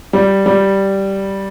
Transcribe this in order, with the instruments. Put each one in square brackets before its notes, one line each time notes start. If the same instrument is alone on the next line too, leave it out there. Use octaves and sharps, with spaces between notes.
[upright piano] G3
G3